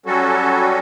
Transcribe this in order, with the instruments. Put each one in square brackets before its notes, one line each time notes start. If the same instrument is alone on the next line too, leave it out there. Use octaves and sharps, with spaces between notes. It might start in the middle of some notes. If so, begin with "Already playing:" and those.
[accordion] F#3 G3 C#4 F#4 A4